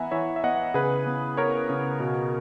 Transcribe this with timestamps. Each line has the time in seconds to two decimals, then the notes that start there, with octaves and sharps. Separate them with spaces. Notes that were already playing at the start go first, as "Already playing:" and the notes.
Already playing: E3 B3 E5 F#5 G#5 A#5 B5
0.11 E3 C#5 E5
0.36 E5
0.44 B3 D#5 F#5
0.74 C#3 G#4 B4
1.06 B3
1.37 B3 A#4 C#5
1.69 C#3
2.00 B2